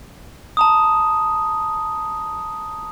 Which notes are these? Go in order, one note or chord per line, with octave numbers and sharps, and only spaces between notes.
A5 A#5 D#6